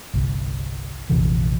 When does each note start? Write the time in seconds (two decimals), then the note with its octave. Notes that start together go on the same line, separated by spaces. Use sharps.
0.14 G1 C2
1.10 A#1 F2 C3 E3